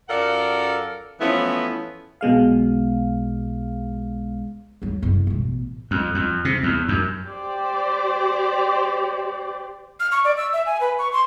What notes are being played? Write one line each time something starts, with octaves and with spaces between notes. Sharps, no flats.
F#2 F4 A4 A#4 D5 F#5
E3 F3 A3 B3 C#4 E4
B1 B2 G#3 F5
D2 F#3
F#1 C3
A1 B2
F2
F2
C3
E2
F#2
G4 C5 D5
F6
C#6
D5
E6
E5
G#5
B4
C#6
C6